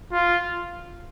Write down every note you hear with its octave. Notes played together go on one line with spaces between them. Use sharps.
F4